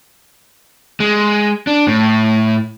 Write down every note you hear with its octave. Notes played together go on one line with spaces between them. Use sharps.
G#3
D4
A2